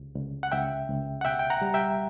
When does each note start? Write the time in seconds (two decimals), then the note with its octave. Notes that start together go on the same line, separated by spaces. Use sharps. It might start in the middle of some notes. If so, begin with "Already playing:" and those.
Already playing: C#2
0.16 C#2
0.43 F#5
0.52 C#2 E5 G5
0.89 C#2
1.21 F#5
1.25 B2 E5 G5
1.39 G5
1.50 F#5 A#5
1.61 G3
1.74 E5 G5